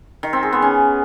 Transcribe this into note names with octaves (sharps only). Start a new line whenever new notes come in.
D#3
C4
G#4
B3
C#4